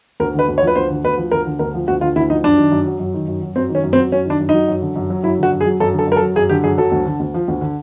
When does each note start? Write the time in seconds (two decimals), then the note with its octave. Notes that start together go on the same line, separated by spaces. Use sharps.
0.20 D2 A#4
0.34 D3 B4
0.49 D2
0.58 C#5
0.62 F3
0.67 B4
0.76 D2 C5
0.90 D3
1.04 D2 B4
1.18 F3
1.31 D2 A#4
1.46 D3
1.59 D2 A#4
1.74 F3
1.88 D2 F#4
2.01 D3 F4
2.16 D2 E4
2.30 F3 D#4
2.44 F#2 D4
2.58 D#3
2.72 F#2
2.86 F#3
3.00 F#2
3.14 D#3
3.28 F#2
3.42 F#3
3.56 F#2 C4
3.69 D#3
3.75 C#4
3.84 F#2
3.93 C4
3.98 F#3
4.12 F#2 C#4
4.25 D#3 D4
4.40 F#2
4.49 F#3 D#4
4.68 F#2
4.82 D3
4.96 F#2
5.10 F#3
5.23 F#2 E4
5.38 D3 F#4
5.52 F#2
5.61 G#4
5.66 F#3
5.80 F#2 A4
5.93 D3
5.99 A4
6.07 F#2 A#4
6.17 A4
6.22 F#3
6.36 F#2 G#4
6.49 D3 G4
6.64 F#2 G#4
6.78 F#3 A4
6.92 D2
7.06 D3
7.20 D2
7.34 F3
7.48 D2
7.61 D3